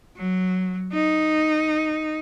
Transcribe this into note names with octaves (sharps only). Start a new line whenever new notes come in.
F#3
D#4